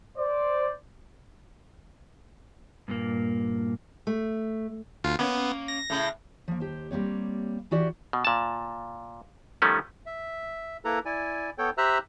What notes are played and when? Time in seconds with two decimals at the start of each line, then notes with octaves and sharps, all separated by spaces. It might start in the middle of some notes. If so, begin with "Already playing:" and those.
0.17 C5 D5
2.88 G2 A#2 A#3
4.07 A3
5.04 D2 F4
5.19 A#3 B3 C#4
5.68 A#6
5.90 A2 C#3
6.48 F3 A#3
6.60 D#2 G4 C5
6.91 G3 A#3 C4 C#5
7.71 E3 E4 F#4 G4 D5
8.13 B2
8.25 A#2 A5
9.62 D#3 F3 G3 A3 C#4
10.06 E5
10.85 A#3 E4 A4 B4 A#5
11.05 E4 D5 G#5
11.58 B3 A4 C#5 G5
11.78 G4 C5 E5 A#5 E6 F#6